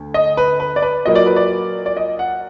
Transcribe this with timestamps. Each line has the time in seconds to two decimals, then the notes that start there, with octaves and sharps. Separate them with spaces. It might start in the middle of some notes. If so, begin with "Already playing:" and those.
Already playing: D2
0.14 D#5
0.37 B4
0.60 B4
0.76 D5
0.82 B4
1.05 A#2 F#3 A#3 D#5
1.15 D5
1.26 B4
1.36 D5
1.86 D5
1.97 D#5
2.19 F#5